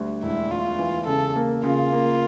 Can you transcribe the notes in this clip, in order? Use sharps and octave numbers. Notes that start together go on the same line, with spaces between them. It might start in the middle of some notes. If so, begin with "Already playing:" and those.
Already playing: D2 G3
E1 E4
E1 F4
E3
C#3 A4
A#3
C#3 F4
A#3